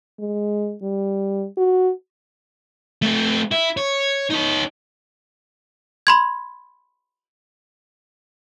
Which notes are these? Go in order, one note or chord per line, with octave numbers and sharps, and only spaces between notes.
G#3
G3
F#4
A3 C4
E4
C#5
D#4 C#5
B5 C6 G#6